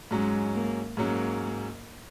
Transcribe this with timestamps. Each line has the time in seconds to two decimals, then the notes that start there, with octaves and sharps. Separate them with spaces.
0.11 G#2 F#3 G#3 C#4
0.55 A#3
0.97 G#2 F#3 A#3 C#4